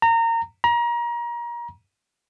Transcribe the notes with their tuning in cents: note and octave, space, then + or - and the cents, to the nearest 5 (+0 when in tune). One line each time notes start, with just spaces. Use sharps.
A#5 -25
A#5 +30